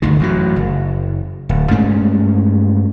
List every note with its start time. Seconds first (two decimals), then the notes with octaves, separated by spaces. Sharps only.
0.02 G1 D2 D#3
0.20 A1 F#2 D#3 F#3
0.56 F#1
1.49 D1
1.71 G2 G#3 A3 C#4